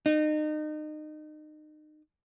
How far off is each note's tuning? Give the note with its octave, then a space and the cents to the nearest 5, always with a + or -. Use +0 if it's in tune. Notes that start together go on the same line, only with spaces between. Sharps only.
D#4 -30